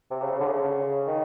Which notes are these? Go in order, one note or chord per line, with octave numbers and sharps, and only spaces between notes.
C3
C#3
C#3
D3
C#3
D#3